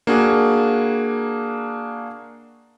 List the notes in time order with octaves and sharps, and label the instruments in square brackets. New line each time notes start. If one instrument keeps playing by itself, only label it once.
[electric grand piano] A#3 D4 F#4 G#4